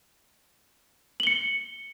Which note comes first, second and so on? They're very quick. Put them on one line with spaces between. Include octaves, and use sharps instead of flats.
F#7 G7 C#7